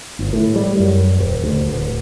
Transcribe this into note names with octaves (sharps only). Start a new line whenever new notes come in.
G1
A2
G3
F#2
D#1
D2
D1